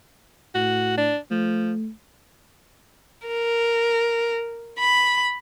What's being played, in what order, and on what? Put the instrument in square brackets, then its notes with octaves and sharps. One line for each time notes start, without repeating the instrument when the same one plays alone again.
[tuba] A2 [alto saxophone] F#4
[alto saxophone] D4
[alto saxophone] F3 [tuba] A3
[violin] A#4
B5